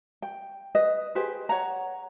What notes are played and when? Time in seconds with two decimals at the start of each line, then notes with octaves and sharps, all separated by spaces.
0.22 G5
0.75 B4 D#5
1.15 G4 G#4 B4 C5
1.49 C#5 F#5 A#5